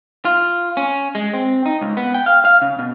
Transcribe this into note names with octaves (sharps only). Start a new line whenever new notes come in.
F4
C#4
G#3
C4
D#4
C#2
B3
G5
F5
F5
C#3
B2